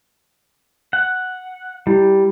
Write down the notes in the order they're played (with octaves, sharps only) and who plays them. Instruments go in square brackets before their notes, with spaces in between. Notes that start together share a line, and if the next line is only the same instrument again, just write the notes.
[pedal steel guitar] F#5
[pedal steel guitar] G3 [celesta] E4 G4